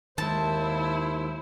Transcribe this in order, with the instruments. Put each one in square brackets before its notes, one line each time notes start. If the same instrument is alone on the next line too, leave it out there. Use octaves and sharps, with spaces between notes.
[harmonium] D#2 C5 [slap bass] D#3 G#3 [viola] E4 [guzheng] A5